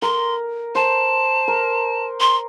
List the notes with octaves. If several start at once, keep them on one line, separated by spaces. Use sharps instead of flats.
A#4 C6
C5 A5
A#4
C6